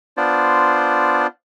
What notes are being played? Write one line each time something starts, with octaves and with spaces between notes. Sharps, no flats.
B3 D4 F4 C5 D5